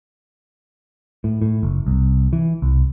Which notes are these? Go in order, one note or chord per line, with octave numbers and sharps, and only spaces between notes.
A2
A2
F#1
C2
E3
C2